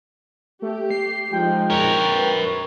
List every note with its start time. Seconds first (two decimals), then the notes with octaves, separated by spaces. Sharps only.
0.62 A3 G4
0.91 C7
1.32 F3 G#3 D#4 G5
1.70 A#4 C#5
2.06 B4